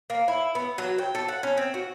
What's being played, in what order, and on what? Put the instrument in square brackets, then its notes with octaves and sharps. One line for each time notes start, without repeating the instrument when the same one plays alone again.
[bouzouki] A#3
E4
B3
F#3
G5
A4
F#5
C#4
C4
F#4